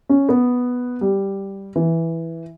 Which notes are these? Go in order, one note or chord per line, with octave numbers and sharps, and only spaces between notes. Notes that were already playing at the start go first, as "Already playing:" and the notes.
C#4
B3
G3
E3